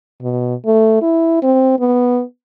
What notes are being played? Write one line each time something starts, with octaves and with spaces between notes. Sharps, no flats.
B2
A3
E4
C4
B3